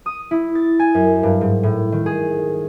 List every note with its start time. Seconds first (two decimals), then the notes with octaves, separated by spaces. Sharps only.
0.06 D#6
0.31 E4
0.55 A6
0.79 G#5
0.95 F#2
1.23 G2
1.41 G#2
1.63 A2
1.92 D#3
2.06 G#4